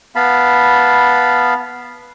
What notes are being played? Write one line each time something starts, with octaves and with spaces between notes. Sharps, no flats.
B3 F5 A5 B5